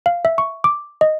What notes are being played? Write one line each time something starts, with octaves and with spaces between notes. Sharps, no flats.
F5
E5
C#6
D6
D#5